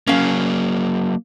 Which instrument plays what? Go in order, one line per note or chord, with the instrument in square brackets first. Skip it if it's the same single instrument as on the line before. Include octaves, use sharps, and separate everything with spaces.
[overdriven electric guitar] F#3 A#3 [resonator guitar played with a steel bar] C#4 F5